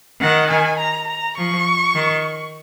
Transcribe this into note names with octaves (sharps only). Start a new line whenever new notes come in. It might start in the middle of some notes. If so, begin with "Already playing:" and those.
D#3 F#5
G#5
A#5
A#5
F3 C#6
D#3